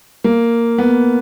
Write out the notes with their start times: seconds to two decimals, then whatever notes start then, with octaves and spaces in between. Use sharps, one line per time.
0.24 A#3
0.78 B3